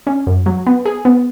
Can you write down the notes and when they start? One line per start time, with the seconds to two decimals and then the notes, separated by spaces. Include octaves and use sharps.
0.07 C#4
0.27 F#2
0.46 F#3
0.66 B3
0.85 G#4
1.05 B3